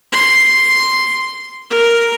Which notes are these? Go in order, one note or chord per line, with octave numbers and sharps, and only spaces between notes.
C6
A#4